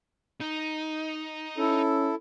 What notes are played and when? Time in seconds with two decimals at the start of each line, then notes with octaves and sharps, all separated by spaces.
0.41 D#4
1.58 C#4 E4 A4